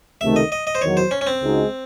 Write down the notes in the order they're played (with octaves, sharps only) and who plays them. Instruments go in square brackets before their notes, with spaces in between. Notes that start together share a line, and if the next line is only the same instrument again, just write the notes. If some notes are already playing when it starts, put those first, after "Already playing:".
[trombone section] C#2 C3 D#3 A3 [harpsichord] E5
[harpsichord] D#5
D#5
D#5
C5
[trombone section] E2 D#3 F#3 [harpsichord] C#5
[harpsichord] C5
C#4
C#4
C4
[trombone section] C#2 C#3 G#3 D#4 F#4